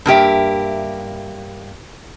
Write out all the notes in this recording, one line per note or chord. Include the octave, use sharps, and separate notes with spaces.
G2 A#3 G4 E5